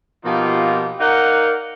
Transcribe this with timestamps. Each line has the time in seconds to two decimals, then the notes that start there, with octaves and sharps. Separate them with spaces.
0.24 B2 F3 A#3 D#4 F4 G4
0.98 D#4 A#4 D5 F5 F#5